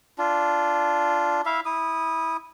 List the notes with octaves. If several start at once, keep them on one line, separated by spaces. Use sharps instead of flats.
D4 F4
E4 E5 F5
E4 D#6